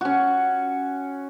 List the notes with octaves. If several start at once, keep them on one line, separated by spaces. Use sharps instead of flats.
C#4 F#4